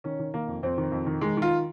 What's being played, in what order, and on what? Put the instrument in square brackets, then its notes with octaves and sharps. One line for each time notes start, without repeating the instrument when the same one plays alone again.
[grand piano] D#3 C#4
D#3
D#3 A#3
F2
F2 C4
D#3
F2
D#3
D#3 G#3
D#3
F4